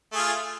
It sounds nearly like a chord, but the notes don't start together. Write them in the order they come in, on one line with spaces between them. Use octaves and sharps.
A3 G#4 F4